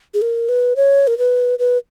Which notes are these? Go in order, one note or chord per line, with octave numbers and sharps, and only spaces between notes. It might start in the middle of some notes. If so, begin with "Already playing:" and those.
G#4
A#4
B4
C#5
A#4
B4
B4